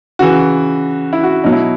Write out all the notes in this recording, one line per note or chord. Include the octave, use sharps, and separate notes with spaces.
C#3 E3 F#4
E4
F#4
B2 F#3 D#4
E4